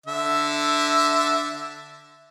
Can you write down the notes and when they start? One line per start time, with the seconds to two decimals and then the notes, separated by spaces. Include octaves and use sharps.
0.06 D3 E5